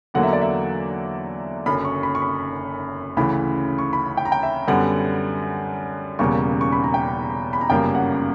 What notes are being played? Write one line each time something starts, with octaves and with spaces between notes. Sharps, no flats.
E2 D3 F#3 A#3 F#5
E5
D5
E5
F#1 F#2 D3 B5
C#6
B5
C#6
B5
D2 C#3 E3 B5
C#6
B5
G5
A#5
G5
E5
F#2 D3 G3 B3 F#5
E1 E2 C#3 G3 A#3 C#6
C#6
B5
A#5
G5
B5
A#5
G1 F#2 C#3 G3 A#3 G5
F#5